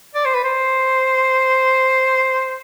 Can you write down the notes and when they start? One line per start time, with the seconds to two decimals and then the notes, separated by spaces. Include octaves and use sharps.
0.15 D5
0.25 C5
0.35 B4
0.44 C5